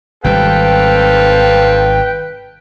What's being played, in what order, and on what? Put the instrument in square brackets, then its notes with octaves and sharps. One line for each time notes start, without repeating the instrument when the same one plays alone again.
[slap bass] G#1 C3 G3 [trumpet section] C4 A4 F5 [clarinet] B4 [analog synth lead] G5